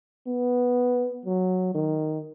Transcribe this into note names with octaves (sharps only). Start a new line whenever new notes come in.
B3
F#3
D#3